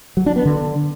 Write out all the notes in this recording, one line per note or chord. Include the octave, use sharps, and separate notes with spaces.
F#3
D4
B3
D3